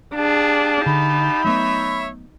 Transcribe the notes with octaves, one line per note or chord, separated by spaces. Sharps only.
D4 G4 G#4 F5 A5
D3 D#4 B5
F#3 A3 B3 C#5 E5